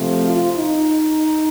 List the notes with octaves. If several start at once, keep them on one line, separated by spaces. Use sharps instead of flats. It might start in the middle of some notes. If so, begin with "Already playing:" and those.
Already playing: C3 F3 A3 C4
F4
D#4